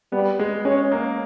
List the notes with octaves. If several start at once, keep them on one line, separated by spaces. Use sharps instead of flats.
G3 B3
G#3
G#3 C#4
A#3